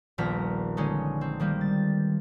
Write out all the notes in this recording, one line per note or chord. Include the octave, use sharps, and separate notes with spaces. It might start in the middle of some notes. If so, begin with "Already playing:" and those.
D#1 A#1 B3 A#4 A#5 B6
D3 G#3 C#4 D#4
C4
D#3 G3 A#3
A6